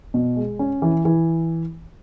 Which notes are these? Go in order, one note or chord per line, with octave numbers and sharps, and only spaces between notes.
B2
G#3
C#4
E3
E3